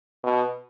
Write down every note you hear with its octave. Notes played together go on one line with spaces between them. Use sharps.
B2